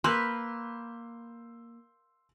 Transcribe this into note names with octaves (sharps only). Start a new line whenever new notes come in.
A#3 B4 C6 E6 G6